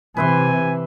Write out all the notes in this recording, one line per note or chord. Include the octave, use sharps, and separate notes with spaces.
C3 E3 B4 E5 G#5 C6